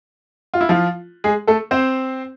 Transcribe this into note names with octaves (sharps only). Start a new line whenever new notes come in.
F4
E4
F3 F4
G#3 G#4
A3 A4
C4 C5